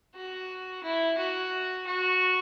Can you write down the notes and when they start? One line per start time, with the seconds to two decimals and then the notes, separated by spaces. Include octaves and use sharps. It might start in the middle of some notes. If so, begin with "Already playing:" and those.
0.15 F#4
0.83 E4
1.18 F#4
1.86 F#4